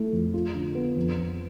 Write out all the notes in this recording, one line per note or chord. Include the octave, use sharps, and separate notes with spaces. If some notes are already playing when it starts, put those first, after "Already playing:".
Already playing: A3 E4
F2
F4
D3
B3
F2
F2